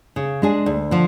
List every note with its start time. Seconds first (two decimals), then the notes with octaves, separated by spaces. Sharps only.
0.16 C#3
0.42 G#3 D4 G#4
0.66 D2
0.91 D3 F3